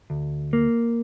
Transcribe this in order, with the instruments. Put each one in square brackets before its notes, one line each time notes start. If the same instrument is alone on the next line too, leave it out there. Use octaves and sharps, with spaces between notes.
[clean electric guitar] D2
A#3